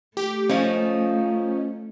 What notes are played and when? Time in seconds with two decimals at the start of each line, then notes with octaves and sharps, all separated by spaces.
0.17 A3 G4
0.49 F3 C#4 D#4